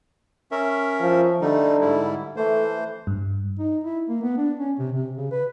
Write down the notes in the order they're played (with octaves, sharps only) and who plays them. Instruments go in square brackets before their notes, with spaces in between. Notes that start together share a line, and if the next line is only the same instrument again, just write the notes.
[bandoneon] C#4 A#4 E5
[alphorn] F3
[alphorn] D3 [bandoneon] G3 A3 D#4
[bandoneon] G#2 G3 E4
[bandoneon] E3 C5 [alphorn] A3
[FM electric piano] G2
[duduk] D#4
E4
A#3
B3
D4
C#4
C3
C3
C#3
B4